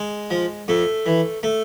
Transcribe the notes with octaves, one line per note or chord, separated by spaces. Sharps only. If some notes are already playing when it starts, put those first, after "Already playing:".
Already playing: G#3
F3
F2 A3
E3
A3